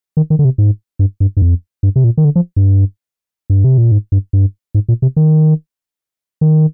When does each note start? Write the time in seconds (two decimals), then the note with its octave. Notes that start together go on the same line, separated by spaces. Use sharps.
0.17 D#3
0.30 D#3
0.39 D3
0.45 C3
0.58 G#2
0.99 G2
1.20 G2
1.37 G2
1.42 F2
1.83 G2
1.96 C3
2.04 A#2
2.17 D#3
2.25 D3
2.36 F3
2.56 G2
3.50 G2
3.64 C3
3.78 A#2
3.92 G#2
4.12 G2
4.33 G2
4.75 G#2
4.89 A#2
5.02 C3
5.16 D#3
6.41 D#3